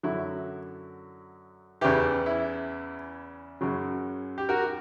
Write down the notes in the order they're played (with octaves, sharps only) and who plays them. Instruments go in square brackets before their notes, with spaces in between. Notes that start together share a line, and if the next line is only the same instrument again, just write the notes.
[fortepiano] F#2 D3 F#3 E4
E2 C#3 E3 E4 G4
E4
F#2 C#3 F#3
G4
F#4 A#4